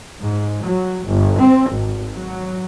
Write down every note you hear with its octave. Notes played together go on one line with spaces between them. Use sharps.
G#2
F#3
G1
C4
G#1
F#3